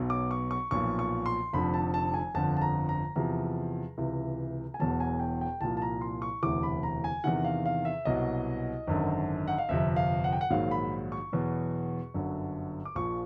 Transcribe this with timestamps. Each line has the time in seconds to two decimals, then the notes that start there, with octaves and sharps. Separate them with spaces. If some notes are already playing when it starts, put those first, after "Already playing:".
Already playing: B1 B2 F#3
0.10 D6
0.31 C#6
0.51 C#6
0.71 B1 A#2 F3 C#6
0.99 C#6
1.26 C6
1.53 F1 F2 D3 F3 B5
1.74 A5
1.94 A5
2.14 G#5
2.34 G1 F2 D3 A5
2.57 A5
2.61 A#5
2.89 A#5
3.16 E2 C3 F3 A#5
3.98 C#2 C3 E3
4.74 G#5
4.80 E1 E2 B2 F#3 A5
5.00 G#5
5.20 G5
5.41 G5
5.61 C2 A#2 F3 A5
5.77 A5
5.82 A#5
6.01 C6
6.22 C#6
6.43 E1 D2 C3 E3 D6
6.63 B5
6.83 A#5
7.04 G#5
7.24 E2 C3 D#3 F#5
7.45 F5
7.66 F5
7.85 E5
8.05 C2 B2 F#3 D#5
8.87 G#1 F#2 D3
9.48 F#5
9.58 F5
9.69 G1 F2 C3 E5
9.96 F5
10.24 F#5
10.33 G5
10.41 F#5
10.50 A#1 G#2 D#3 F#3 F5
10.71 B5
11.12 C#6
11.33 E2 B2 F#3
12.14 G1 F#2 D3 F#3
12.85 D6
12.95 A#1 A#2 F3 C#6